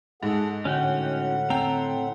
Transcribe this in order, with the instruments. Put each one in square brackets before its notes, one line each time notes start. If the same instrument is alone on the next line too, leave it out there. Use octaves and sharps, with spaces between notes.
[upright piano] G#2 [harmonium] G#4 A4 F#5
[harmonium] A2 F#5 [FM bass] D3 [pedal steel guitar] C#4 F#4 G5
[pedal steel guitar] C4 A4 A#5 [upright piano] G5